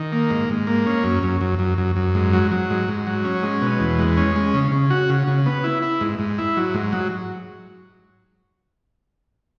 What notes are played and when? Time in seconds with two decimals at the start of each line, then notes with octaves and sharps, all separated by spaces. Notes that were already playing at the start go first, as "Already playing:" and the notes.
Already playing: D#3
0.12 A#3
0.31 G#2
0.50 G#2
0.67 A#3
0.86 C#4
1.04 F#2
1.23 F#2
1.41 F#2
1.59 F#2
1.78 F#2
1.96 F#2
2.15 G#2
2.33 F#3
2.51 F#3
2.70 G#2
2.88 G#2
3.07 F#3
3.24 C#4
3.43 G#3
3.61 B2
3.80 E2
3.99 G#3
4.17 C#4
4.36 G#3
4.54 C#3
4.72 C#3
4.90 F#4
5.09 C#3
5.27 C#3
5.46 B3
5.64 E4
5.83 E4
6.01 G#2
6.19 G#2
6.38 E4
6.57 F#3
6.74 G#2
6.93 F#3